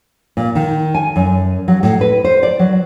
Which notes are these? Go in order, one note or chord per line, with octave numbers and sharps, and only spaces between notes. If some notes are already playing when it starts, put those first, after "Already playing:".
A#2
D#3
G#5
F#2
F#3
A2
B4
C5
D5
F#3